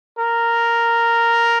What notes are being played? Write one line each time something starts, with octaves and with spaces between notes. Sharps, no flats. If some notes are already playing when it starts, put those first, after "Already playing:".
A#4